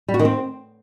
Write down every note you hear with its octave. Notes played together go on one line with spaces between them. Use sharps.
G3
F#4
D#3
C4